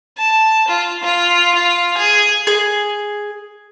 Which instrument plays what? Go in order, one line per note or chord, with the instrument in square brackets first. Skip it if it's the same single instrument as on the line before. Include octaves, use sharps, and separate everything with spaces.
[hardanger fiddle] A5
F4
F4
F4
G#4
[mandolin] G#4